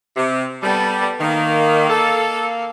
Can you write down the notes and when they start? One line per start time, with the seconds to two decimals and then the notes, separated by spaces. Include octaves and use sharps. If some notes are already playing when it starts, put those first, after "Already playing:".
0.15 C3
0.62 G3 B3 A4
1.20 D#3 A#3 F5
1.89 A4